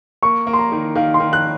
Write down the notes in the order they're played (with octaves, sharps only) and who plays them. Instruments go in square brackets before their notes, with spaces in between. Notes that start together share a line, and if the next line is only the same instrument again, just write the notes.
[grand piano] A#3 [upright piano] C#6
[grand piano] A#3
[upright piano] C6
A#5
[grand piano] D#3
[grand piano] D#3 [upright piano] F5
[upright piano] C6
[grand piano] D#3
[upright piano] F#6